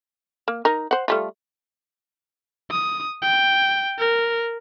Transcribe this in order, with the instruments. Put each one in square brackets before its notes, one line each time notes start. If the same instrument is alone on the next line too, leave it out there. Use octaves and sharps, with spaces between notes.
[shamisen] A#3
D#4 A#4
C5 F#5
G3 A3 F4
[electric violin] D#6
G5
A#4